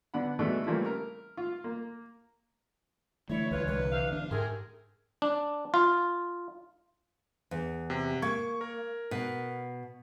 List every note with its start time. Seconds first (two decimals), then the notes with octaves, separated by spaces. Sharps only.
0.14 D3 B3 D4 F#5 B5
0.39 B2 E3 G#3 A3 B3 D4
0.66 C#3 E3 F3 G3 A3 A#3
0.86 A#4
1.37 F4
1.64 A#3
3.30 D3 E3 A3 E4 C#5
3.51 C#2 G#3 F4 B4 C#5
3.68 C2 B4
3.90 C3 F5
4.12 D4
4.31 G#2 A3 G4 G#4 A#4 C6
5.22 D4
5.74 F4
7.51 E2
7.90 C3
8.22 A#3 C#6 G#6
8.61 A#4
9.11 B2